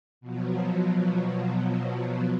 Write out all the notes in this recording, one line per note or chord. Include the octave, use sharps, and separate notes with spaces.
B2 F3 F#3